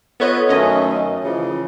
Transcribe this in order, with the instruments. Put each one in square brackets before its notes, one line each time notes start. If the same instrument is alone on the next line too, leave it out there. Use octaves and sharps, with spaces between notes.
[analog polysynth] B3 B4 D#5 [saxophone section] F4 A4 C#5
[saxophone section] F#2 D#3 A3 [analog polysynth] C#4 D#5
[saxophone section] C#3 E3 F3